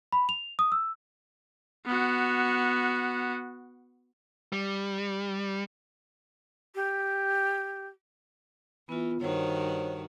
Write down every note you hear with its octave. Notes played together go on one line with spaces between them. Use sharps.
B5
F7
D#6
E6
B3 F#4
G3
G4
E3 B3 F4
G2 D#3 F#4 C5 C#5